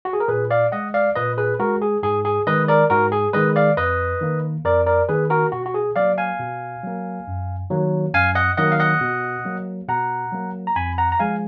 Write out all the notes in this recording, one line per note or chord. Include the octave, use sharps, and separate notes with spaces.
F#4
G#4
A#4
A#2 G#4 B4
D5 F5
G#3 D#5 F#5
D5 F5
A#2 B4 D#5
G#4 B4
G#3 F#4 A#4
G#4
G#2 G#4
G#4
D#3 G#3 B4 D#5
A#4 D5
G#2 F#4 A#4
G#4
D#3 G#3 B4 D#5
D5 F5
F2 B4 D#5
D#3 A#3
F2 A#4 D5
A#4 D5
D#3 A#3 G#4 B4
F#4 A#4
B2 F#4
F#4
G#4
F#3 A#3 D5 F5
F5 G#5
B2
F#3 A#3
F#2
D#3 F#3 A#3
F#2 F5 G#5
D#5 F#5
D#3 F#3 A#3 D#5 F#5
F5
D#5 F#5
B2
F#3 A#3
B2 F#5 A#5
F#3 A#3
A#5
F2 G#5 B5
F#5 A#5
A#5
F3 G#3 F5 G#5